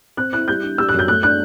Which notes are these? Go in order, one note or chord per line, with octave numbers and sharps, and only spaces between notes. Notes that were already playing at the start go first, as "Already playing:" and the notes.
C4 F#6
E4 F#6
G3 G6
D4
G3 E6
F#6
F#2 G6
A3 F#6
D4 F#6